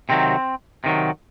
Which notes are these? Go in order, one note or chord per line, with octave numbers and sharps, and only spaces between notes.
C3 D#3 F#3 C4
C3 D#3 F#3